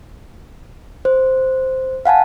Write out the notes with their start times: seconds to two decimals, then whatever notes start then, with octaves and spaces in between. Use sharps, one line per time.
1.05 C5
2.06 F5 F#5 G#5 A5